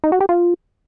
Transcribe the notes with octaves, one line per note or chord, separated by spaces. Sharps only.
D#4
F#4
G4
F4